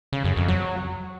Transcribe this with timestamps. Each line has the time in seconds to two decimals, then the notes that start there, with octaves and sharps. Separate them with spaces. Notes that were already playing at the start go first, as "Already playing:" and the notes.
0.13 C#3
0.24 F#2
0.36 F2
0.48 F#3